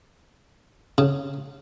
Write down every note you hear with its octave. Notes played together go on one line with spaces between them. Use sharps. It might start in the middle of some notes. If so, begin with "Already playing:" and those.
C#3